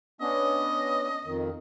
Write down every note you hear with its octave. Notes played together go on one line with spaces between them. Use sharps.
B3 C#4 D4 D#5
F2 D#3